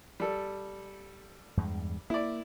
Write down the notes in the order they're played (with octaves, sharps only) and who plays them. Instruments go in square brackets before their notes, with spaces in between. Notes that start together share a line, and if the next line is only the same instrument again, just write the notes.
[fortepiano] G3 A4
[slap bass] E2 G2 G#3
[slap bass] A#3 [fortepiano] E4 D5